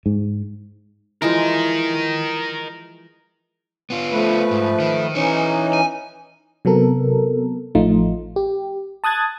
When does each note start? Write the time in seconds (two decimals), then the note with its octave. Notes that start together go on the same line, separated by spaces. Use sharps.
0.06 G#2
1.22 E3 F3 G#3 A#4 D#5
3.90 B3 F4
4.12 F3 A3 B4
4.51 G#2
4.80 D#3
5.15 E3 C#4 D#4 B4 C#5
5.73 G#5
6.65 C3 F#3 B3 A4 A#4
7.75 A1 F3 A3 D#4 F4
8.36 G4
9.04 A5 D#6 F#6 G#6 A6